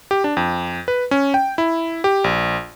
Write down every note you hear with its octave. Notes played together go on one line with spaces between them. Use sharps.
G4
D4
F2
B4
C#4
G5
E4
G4
A#1